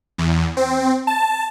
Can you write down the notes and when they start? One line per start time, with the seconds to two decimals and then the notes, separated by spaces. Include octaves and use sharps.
0.18 E2
0.57 C4
1.07 A5